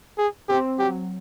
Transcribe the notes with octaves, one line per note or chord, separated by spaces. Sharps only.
G#4
C4 G4
F#3 G4